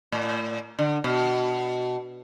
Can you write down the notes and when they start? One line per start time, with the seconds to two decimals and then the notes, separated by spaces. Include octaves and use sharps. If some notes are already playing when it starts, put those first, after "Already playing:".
0.12 A2
0.79 D3
1.04 B2